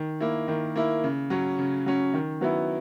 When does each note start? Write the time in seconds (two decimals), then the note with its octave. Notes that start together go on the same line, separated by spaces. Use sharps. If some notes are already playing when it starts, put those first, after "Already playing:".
Already playing: D#3
0.20 A#3 E4
0.48 D#3
0.76 A#3 E4
1.04 C#3
1.30 F#3 C#4
1.59 C#3
1.86 F#3 C#4
2.14 D#3
2.41 F#3 B3 E4